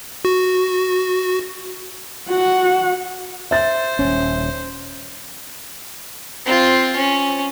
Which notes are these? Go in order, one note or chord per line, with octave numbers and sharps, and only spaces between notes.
F#4
F#4 F#5
C5 E5 A6
D#1 G#1 C#4
C4 F4
C#4